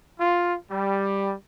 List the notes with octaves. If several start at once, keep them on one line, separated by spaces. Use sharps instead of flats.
F4
G3